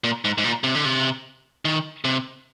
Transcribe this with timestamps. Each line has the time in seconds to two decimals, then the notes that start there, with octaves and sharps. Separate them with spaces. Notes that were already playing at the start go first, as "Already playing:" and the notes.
0.04 A#2
0.25 G#2
0.38 G#2
0.44 A#2
0.64 C3
0.75 D3
0.85 C3
1.65 D#3
2.04 C3